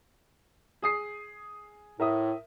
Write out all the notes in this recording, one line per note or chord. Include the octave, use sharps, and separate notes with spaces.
G#4 D#6 C7
A2 A#4 E5 D#6